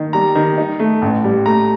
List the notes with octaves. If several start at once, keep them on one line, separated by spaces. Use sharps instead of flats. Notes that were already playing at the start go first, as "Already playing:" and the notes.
Already playing: D#3
G3 A#5
D#3
D#4
A3
A1
G3
A3 A#5